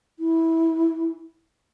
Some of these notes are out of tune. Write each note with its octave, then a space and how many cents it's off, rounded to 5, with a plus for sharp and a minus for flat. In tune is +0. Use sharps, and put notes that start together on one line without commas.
E4 -15